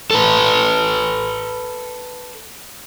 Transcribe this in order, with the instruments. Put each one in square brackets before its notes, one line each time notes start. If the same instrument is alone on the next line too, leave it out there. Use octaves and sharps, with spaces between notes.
[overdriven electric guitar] A4 B4